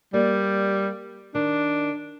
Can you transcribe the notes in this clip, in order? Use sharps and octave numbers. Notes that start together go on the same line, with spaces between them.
G3 A#3 D5
D#3 D4